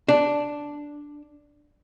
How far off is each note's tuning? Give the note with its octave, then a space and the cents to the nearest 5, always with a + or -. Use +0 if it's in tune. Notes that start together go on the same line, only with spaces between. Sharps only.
D4 +0